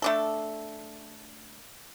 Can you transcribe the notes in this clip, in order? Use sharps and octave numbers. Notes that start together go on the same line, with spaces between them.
A3 D4 A4